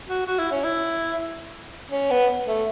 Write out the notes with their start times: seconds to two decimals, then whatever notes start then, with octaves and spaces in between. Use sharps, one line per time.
0.09 F#4
0.26 F#4
0.39 E4
0.51 C#4
0.64 E4
1.91 C#4
2.10 B3
2.47 A3